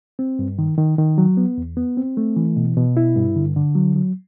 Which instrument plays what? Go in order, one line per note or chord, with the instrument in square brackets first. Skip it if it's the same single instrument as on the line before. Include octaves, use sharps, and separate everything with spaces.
[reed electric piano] C4
G2
D#3
D#3
D#3
F#3
B3
E2
B3
C4
A3
E3
B2
B2
E4
G2
D3
D3
F#3
F#3